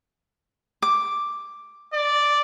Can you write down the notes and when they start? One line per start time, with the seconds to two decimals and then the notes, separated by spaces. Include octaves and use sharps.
0.82 D6
1.93 D5